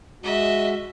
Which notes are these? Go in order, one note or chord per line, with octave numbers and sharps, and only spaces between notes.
G#3 F#4 D#5 E5